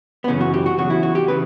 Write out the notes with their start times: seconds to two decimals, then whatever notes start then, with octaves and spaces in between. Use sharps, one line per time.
0.24 B3
0.28 F#2 C#3 E3 C#4
0.41 F#4
0.54 G4
0.66 F#4
0.78 E2 C#3 F#3 F#4
0.90 E4
1.03 F#4
1.15 G4
1.28 C#3 E3 B4